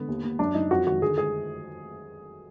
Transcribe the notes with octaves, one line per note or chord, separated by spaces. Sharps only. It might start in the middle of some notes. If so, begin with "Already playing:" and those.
Already playing: D3 B3
D#2
D#2
F#2 D4
F#2 D#4
F2 F#4
D#3 F#4
D3 G#4
G#4